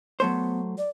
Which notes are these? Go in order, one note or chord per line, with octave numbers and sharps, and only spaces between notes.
F#3 A3 B3 C5
D5